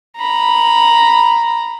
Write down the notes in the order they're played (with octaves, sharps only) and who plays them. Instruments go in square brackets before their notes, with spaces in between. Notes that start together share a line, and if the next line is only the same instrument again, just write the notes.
[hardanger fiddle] A#5 B5